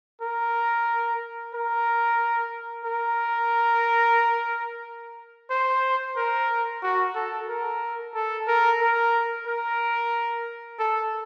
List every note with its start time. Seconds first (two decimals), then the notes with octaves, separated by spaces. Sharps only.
0.21 A#4
1.54 A#4
2.85 A#4
5.50 C5
6.17 A#4
6.83 F#4
7.15 A4
7.49 A#4
8.15 A4
8.48 A#4
8.81 A#4
9.47 A#4
10.79 A4